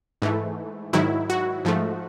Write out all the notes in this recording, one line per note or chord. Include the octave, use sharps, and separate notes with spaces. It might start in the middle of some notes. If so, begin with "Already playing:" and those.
G#2 E3 A3
G#2 D#3 F#3 E4
F#4
G#2 F3 A3